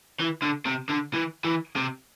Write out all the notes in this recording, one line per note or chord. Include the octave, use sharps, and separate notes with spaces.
E3
D3
C3
D3
E3
E3
C3